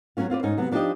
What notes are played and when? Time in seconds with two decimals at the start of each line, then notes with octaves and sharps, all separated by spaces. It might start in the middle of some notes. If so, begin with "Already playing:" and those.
0.17 F#3 A3 B3 C#4 F4
0.30 C4 F4 B4 D5
0.43 G#2 C#4 D#4 G#5
0.57 C3 F#3 B3
0.72 F3 D4 D#4 F4 G4 D#5